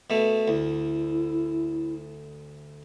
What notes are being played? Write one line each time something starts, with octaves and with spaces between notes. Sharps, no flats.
B2 A3
D2 E4